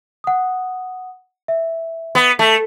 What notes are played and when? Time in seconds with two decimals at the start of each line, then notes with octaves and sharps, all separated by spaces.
0.24 F#5 D#6
1.48 E5
2.15 B3
2.39 A3 A5 B6